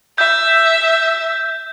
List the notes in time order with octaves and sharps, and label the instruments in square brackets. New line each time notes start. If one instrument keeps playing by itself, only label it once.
[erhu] E5 [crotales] G6